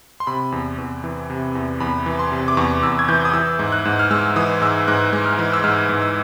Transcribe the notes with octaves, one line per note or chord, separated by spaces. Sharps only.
C6
C3 B5
E2
E2
E3
C3
E2
E2 B5
E3
C6
C3
D6
E2 C#6
E2 E6
G#6
E3 G6
D#6
E3 E6
G#2
F#6
G#2
F6
G#3 E6
E3 D#6
G#2 E6
G#2 F#6
G#3
F6
E3
E6
G#2 F6
G#2
E6